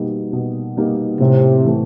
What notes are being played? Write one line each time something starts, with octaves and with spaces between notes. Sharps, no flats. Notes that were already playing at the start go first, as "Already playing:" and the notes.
Already playing: B2 G3 A#3 D#4
B2
G3 A#3 D#4
A2 C3
E3 A3